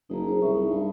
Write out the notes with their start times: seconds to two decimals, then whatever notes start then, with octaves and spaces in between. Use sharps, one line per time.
0.10 F#1 D#4 G#4 A#5
0.24 G#4 C5
0.40 C2 G#4 E5 C#6
0.55 D#4
0.70 G2